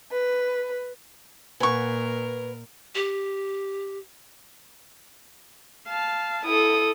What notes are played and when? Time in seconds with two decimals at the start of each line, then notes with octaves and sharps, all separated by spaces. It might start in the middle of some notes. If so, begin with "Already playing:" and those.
0.11 B4
1.60 A#2 A#4 B4 F#5 G#5 C#6
2.95 G4
5.87 F5 A5
6.46 E4 A4 D#6